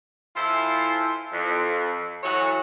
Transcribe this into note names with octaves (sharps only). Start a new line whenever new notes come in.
E3 E4 F4 A4 C5
F2
E3 F#3 A3 F#4 C#5